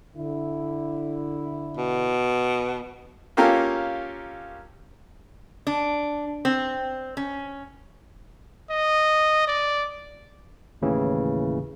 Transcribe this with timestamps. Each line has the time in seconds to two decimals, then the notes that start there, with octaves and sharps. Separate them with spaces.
0.16 D3 E4
1.77 B2
3.37 A#3 C#4 F4 G4 A4 A#4
5.67 D4
6.45 C4
7.17 C#4
8.70 D#5
9.48 D5
10.82 D#2 A2 C#3 E3